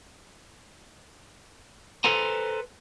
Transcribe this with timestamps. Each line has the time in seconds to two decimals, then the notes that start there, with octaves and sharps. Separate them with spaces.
2.04 A4 B4 C5 G#5 A#5